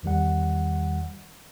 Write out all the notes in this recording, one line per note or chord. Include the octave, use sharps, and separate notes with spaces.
E2 D#3 G3 F#5